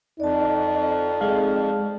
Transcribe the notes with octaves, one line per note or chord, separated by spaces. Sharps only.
F2 D#4 D5 A5
G#3 F5